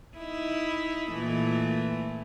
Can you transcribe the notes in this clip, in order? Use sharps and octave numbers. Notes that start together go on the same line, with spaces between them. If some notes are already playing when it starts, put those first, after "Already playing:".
D#4 E4
A#2 E3 A3